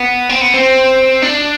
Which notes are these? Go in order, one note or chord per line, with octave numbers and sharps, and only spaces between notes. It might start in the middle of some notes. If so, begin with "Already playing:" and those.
Already playing: B3
C4
B3
C4
D4